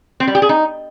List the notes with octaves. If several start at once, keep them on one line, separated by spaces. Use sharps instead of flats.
C4
G3
G4
G#4
D#4